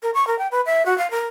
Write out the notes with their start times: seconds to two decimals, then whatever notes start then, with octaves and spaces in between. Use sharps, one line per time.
0.03 A#4
0.14 C#6
0.27 A#4
0.39 G5
0.51 B4
0.66 E5
0.86 F#4
0.98 F5
1.11 A#4